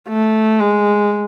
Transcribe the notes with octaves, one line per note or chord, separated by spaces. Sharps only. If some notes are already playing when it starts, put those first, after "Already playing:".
A3
G#3